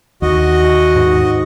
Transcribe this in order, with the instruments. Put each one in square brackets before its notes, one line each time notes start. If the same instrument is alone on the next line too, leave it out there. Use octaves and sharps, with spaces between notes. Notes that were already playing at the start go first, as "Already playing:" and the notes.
[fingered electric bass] D#2 [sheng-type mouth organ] F#4 D#5
[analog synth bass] G#2